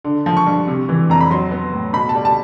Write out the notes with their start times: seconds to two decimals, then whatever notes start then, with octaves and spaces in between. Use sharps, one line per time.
0.05 D3
0.26 F3
0.37 C#6
0.47 G2
0.67 C3
0.89 E3
1.10 F2 A#5
1.21 B5
1.30 F#3 C6
1.51 B3
1.73 A2
1.93 B2 B5
2.09 A5
2.15 G3
2.25 A5